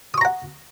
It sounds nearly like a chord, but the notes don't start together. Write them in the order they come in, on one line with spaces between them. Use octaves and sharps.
D#6 C#6 A#5 F#5